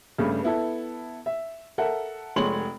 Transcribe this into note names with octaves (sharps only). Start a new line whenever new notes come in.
G2 C#3 G3 A3
B3 E4 A4
E5
A4 A#4 E5 F#5
F1 G#3 C#5 C6 F#7